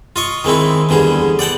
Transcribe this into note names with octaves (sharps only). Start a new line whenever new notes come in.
F4 D#5 C#6
D#3 G#3 C4 E4
E2 D3 G3 G#4
D5 F#5 G5 A5